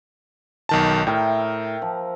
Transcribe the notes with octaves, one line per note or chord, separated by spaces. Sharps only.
B1 D#3 A5
A2 A#4 E5 G5
F3